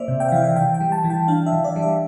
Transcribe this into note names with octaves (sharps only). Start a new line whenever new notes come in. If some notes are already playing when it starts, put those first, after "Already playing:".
Already playing: A#3 C5 D5 E5
C3
G5
F5
E3 E5
F5
E3 G5
G5
G3
A5
E3
G5
D4 F5
E5
E3
D5
G3
E5